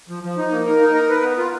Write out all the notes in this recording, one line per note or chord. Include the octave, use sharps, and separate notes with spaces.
F3
F3
D#4
A#3
A#4
D#4
A#4
B4
B3
F4